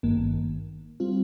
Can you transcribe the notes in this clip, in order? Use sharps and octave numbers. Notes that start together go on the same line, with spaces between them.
G#1 G2 D#3 A#3
G3 C4 F4